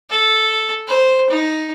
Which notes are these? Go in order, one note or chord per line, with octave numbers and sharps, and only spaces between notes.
A4
C5
D#4